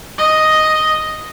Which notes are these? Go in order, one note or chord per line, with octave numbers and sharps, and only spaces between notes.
D#5